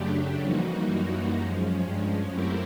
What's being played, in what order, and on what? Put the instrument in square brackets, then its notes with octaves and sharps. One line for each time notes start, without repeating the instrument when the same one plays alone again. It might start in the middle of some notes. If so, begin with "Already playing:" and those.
Already playing: [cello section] F#2 [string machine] C#3 F#3 A3 D4 G4
[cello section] F2 [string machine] E3 G3 A#3 D#4 F#4
[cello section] F#2
[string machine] F3 G#3 C#4
[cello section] G2
[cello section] F#2 [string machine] A3 C4 E4 G4 A#4